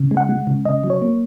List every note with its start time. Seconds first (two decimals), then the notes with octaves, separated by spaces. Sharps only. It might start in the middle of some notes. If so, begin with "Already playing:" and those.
Already playing: C#3
0.11 G#3
0.17 F#5
0.29 G#3
0.47 C#3
0.65 C#3 D#5
0.84 F#3
0.90 C#5
1.02 A#3